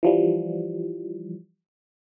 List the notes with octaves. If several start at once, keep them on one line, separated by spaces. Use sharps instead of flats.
E3 F3 G3